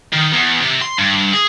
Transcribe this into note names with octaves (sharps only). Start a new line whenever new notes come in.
D#3
E2
C3
C6
G2
G#4